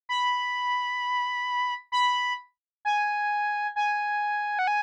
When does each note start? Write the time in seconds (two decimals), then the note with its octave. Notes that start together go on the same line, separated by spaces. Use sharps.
0.09 B5
1.92 B5
2.85 G#5
3.76 G#5
4.59 F#5
4.67 G#5